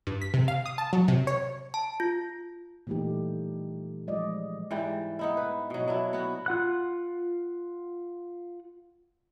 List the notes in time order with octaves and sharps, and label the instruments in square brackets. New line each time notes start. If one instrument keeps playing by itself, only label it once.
[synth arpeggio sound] G2
B6
C3
F5
D#6
A5
F#3
C3
C#5
[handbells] A5
F4
[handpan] A#2 E3 G3 A3 D#4 G4
F3 G#3 D5 D#5
[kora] G#2 E3 G3 G5
B3 D#4 E4
B4
B2 F#3
F#3 D4 E4
B3 F#4
[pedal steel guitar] F4 F#5 F#6